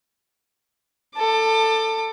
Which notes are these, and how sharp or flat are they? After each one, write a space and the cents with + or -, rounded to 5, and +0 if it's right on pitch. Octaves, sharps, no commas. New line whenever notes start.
A4 +15 D6 +30